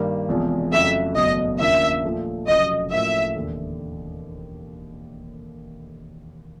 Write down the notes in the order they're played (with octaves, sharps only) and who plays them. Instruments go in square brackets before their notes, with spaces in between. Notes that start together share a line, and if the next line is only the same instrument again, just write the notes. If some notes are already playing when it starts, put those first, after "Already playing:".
Already playing: [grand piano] G2 D#3 G3 A#3
E1 E2 C3 F3 G#3
[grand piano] F2 C#3 F#3 A3 [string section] E5
[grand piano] F#1 E2 B2 F#3 A3 [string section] D#5
[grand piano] D#2 C#3 F3 A#3 D4 [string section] E5
[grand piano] A#2 F3 A3
[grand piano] F1 F2 C#3 F#3 [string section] D#5
[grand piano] A2 F3 A#3 C#4 F#4 [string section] E5
[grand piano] E1 D#2 D3